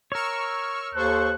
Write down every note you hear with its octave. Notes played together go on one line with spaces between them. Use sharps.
A#4 C#5 C#6 E6 F6
D#2 A4 C5 C#6 F#6